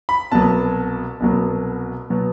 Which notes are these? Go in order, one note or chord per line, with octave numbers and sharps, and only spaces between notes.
B5
C2 B2 F#3 B3 A5
C2 B2 F#3 B3
B2 F#3 B3